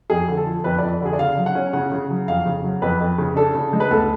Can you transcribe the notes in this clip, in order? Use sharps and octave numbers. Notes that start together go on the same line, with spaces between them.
F2 G#4
D3
A4
F3
F2 B4
F2 D5
D3 G#4
D5
C#3 F5
F#3
F#5
C#4
C#3 F#5
C#3
F#3
F2 F5
C#3
F#3
F2 B4
F2
C#3
D4 A4
C#3
G#3
B4
D2 A4